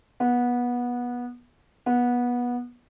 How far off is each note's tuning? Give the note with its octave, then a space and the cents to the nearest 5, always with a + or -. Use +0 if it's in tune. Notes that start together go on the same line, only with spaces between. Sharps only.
B3 -20
B3 -20